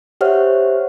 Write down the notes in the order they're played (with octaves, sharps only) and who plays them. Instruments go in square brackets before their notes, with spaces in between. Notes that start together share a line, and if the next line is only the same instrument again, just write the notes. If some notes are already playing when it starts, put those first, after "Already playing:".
[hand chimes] G4 C5 C#5 E5 F#5 F6